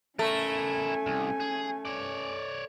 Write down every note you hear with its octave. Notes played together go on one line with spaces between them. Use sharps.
A3 C#4 E4 A#4 G#5
C2
G#4
C#5 D5